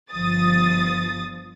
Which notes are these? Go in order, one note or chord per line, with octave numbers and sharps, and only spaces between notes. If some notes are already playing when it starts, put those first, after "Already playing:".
G1 F3 D#6 A6